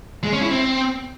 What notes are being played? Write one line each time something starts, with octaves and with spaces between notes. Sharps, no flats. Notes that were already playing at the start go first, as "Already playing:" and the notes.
G#3
C#4
E4
C4